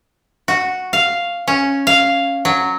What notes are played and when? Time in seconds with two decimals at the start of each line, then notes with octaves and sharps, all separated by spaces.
0.48 F#4
0.93 F5
1.48 C#4
1.87 F5
2.45 F#3